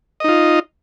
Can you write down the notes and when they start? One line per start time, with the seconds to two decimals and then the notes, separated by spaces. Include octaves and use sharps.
0.20 D#5
0.24 D#4
0.28 F4